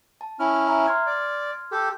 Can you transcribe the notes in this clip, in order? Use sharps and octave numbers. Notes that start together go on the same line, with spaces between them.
A5
C#4 E4 F6
E5 A#5
C6 F6 G#6
D5
G4 A4